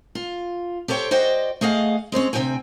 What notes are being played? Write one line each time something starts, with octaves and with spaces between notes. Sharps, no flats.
F4
G4 A4 C5 C#5 G5
F#4 C5 D5 D#5 G5
A3 G#4 D#5 F5 F#5
G#3 C4 C#4 C#5
D2 C3 F3 D#4 G5 G#5